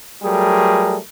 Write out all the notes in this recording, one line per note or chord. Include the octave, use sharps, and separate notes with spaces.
F#3 G3 A3 G#4 A#4